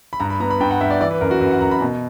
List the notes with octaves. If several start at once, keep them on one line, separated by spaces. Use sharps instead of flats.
B5
G2 A#5
B5
B3 A#5
B5
G2 G5
F#5
G2 E5
D5
E3 D5
B4
F#2 A#4
F#4
F#2 B4
F#5
F#2 A#5
B5
B2